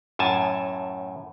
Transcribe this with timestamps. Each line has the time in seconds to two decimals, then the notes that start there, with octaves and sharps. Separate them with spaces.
0.19 F#2 A2 G#5 A5